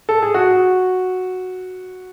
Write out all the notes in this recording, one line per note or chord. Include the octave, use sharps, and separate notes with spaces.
A4
G#4
F#4